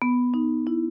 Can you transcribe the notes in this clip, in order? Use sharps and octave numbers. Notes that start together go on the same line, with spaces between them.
B3
D#4
E4